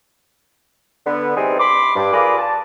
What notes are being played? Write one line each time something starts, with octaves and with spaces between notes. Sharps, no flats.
D3 B3
E3 G3 C4 D#4 G#4
B5 C6 D6
G2
F4 G#4 A#4 B4 D5
A5